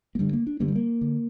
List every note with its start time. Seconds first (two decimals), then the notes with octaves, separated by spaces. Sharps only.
0.15 A#3
0.19 G2 D3 G3
0.33 A#3
0.47 D4
0.60 G2 D3 A#3
0.68 G3
0.75 A#3
1.01 D3